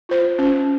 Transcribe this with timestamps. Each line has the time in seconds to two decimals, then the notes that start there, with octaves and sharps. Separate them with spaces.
0.09 F4 C5
0.39 C#4